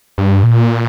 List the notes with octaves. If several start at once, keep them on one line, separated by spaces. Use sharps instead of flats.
G2
A#2